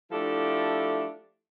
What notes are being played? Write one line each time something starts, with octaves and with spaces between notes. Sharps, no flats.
F3 A3 D4 E4 G4 A4